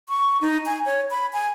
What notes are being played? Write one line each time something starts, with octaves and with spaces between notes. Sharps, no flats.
C#6
D#4
G#5
C#5
B5
G#5